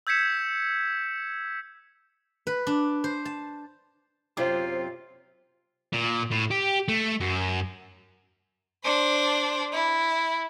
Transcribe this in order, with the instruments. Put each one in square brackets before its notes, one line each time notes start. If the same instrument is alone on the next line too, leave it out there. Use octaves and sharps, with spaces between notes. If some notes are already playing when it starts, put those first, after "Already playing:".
[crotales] E6 G6 G#6 B6 C#7 E7
[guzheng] B4
D4
C5
A5
[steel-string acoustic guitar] F#2 C3 C4 [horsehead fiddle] F4 [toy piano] C5 D6
[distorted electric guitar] A#2
A2
G4
A3
F#2
[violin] D4 C5
E4